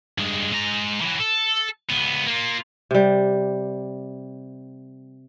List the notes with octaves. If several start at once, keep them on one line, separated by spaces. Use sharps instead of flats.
G2 G#3
G#3 A#5
E3 F#3
A4
C#2 B3
A#3 F4
C3 G3